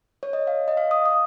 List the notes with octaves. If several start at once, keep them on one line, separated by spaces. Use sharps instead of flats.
C#5
D#5
F5
D#5
F5
D#6
D#6